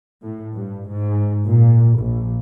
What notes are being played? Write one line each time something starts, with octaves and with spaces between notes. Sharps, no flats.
A2
G2
G#2
A#2
A#1